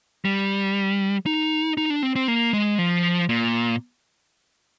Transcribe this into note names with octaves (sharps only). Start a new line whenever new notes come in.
G3
D#4
D#4
D4
C4
C4
A#3
G#3
F3
A#2